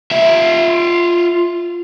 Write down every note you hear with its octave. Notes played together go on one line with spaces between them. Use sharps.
F4 E5